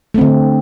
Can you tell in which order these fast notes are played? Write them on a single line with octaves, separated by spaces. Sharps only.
A3 C4 D3